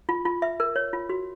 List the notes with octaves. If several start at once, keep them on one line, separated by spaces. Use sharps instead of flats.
F4
F4
E5
A#4
C#5
F4
F#4